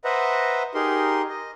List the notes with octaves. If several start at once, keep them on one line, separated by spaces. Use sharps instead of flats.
B4 C5 D#5 E5 F#5 A#5
D#4 G4 G#4 A#4 C6
D#5